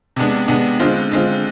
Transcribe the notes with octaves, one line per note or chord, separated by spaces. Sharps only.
C3 G#3 B3 D4
C3 G#3 B3 D4
D3 G#3 C4 F4
D3 G#3 C4 F4